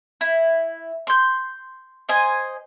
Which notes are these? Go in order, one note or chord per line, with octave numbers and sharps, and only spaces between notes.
E4
C6 G6
C5 D#5 G#5